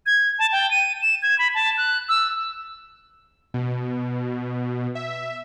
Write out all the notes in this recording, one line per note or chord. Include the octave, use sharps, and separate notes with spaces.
G#6
A5
G5
D#7
E7
G#6
B5
A5
F#6
E6
B2
E5